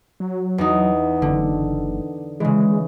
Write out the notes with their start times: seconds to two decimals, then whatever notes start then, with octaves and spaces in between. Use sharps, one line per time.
0.20 F#3
0.58 E2 D#4
1.22 F#1 D3
2.40 C#3 E3 G#3